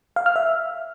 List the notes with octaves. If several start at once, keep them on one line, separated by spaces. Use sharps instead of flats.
F5
F6
E5